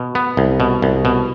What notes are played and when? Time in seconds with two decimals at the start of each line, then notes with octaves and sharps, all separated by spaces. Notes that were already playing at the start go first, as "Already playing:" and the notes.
Already playing: B2
0.15 B3
0.37 C2
0.60 B2
0.82 C2
1.05 B2